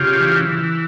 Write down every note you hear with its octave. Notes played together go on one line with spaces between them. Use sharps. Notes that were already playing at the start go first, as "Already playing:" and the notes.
Already playing: C#3 F4 G4
E3
E3